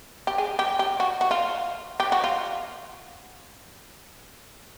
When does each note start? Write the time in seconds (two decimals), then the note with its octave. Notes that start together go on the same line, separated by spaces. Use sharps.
0.27 G4
0.38 G#4
0.59 G4
0.79 G4
1.00 F#4
1.21 F#4
1.31 F4
2.00 G4
2.12 F#4
2.24 F4